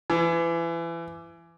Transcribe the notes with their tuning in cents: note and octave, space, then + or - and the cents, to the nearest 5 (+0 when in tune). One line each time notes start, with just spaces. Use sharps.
E3 +30